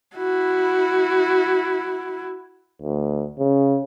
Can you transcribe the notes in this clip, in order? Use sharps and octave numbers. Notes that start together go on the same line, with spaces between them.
E4 F#4
D2
C#3